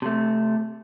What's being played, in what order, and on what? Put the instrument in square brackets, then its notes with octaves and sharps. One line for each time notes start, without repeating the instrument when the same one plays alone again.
[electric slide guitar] C3 A3